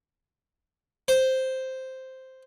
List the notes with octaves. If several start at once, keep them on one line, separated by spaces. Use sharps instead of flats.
C5